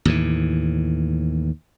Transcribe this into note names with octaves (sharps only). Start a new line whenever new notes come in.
D#2 A2 E3